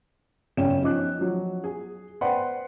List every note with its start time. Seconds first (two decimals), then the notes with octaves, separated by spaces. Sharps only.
0.57 F#1 C#4 D5 G5 E7
0.83 F3 C#4 D#4 D6 F#6
1.19 F3 F#3
1.64 G#4
2.21 B4 C5 D5 F#5 G5 C6